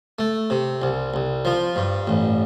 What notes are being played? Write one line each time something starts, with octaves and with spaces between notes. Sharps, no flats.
A3
C3
C2
C2
F3
G2
A1